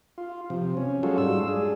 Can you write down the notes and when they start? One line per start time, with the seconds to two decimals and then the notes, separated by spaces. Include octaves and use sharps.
0.18 F4
0.50 C3 F3
0.77 C#4
1.03 F#3 G#3 C#4 F4 F#4 A4
1.18 G#2 G3 F4 E6
1.48 D4 G#4